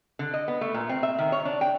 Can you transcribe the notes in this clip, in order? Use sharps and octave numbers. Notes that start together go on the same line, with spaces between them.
D3
D#5
B3
A3
A#2
C4
E5
D#3
C#5
D4
G5